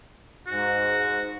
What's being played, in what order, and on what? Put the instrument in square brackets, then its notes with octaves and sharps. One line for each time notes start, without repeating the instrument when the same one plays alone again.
[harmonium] G#2 [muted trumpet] F#4